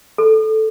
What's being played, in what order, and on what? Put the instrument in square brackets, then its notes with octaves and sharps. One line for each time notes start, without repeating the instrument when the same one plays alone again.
[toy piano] A4